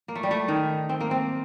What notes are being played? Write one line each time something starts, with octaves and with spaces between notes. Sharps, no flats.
A#3
A3
G3
A3
D#3
C4
A#3
C4